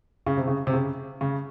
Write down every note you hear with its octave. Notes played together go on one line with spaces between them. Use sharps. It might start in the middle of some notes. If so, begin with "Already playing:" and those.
C#3
C3
C#3
C3
C#3
C#3